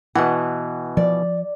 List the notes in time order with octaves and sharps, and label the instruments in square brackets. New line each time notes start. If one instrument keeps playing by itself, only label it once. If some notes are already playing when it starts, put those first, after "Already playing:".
[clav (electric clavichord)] B2 E3 [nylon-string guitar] F#5
[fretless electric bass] F3 [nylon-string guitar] D5